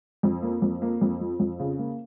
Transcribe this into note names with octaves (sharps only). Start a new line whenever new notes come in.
F2
A#3
F2
A#3
F2
F3
F2
C#3
A#3